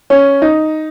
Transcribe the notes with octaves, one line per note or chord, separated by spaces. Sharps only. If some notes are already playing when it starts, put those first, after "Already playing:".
C#4
D#4